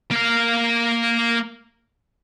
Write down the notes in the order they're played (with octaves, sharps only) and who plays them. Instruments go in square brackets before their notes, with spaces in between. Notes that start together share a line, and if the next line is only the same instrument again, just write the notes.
[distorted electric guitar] A#3 F5